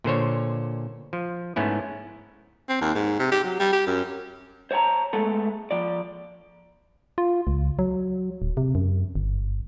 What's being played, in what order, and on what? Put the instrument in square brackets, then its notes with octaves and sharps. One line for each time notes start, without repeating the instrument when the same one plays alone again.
[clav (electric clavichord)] A#2 D3 C5 C#5
F3
G#2 A3 B3 C#4 E4
[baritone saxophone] C4
D#2
G#2
C3
G4
F#3
G3
G4
F#2
[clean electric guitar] C5 C#5 E5 A5 A#5
G#3 A3 B3 A4
F3 D5
[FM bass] F4
C#2
F#3
D1
C3
F#2
G1